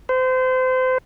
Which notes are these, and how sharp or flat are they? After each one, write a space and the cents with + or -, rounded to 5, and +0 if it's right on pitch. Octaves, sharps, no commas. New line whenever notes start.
C5 -30